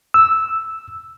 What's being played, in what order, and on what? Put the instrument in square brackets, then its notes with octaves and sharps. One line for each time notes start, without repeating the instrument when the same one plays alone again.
[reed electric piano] E6